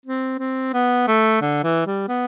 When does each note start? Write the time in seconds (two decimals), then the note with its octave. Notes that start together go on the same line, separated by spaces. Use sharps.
0.06 C4
0.39 C4
0.74 B3
1.08 A3
1.41 D3
1.64 E3
1.86 G3
2.08 B3